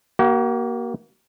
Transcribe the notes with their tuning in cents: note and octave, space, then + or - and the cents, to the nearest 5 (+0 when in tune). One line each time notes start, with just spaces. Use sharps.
A#3 +15 F#4 +45